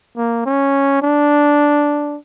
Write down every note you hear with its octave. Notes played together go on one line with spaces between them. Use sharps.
A#3
C#4
D4